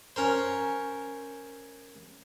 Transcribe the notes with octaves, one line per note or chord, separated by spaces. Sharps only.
C#4 A#4 C5